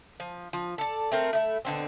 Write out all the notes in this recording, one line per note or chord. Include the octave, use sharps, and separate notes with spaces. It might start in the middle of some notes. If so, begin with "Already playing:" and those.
F3
F3
A4 D5
A3 C4 A#4
A3 E4
B2 D3 C4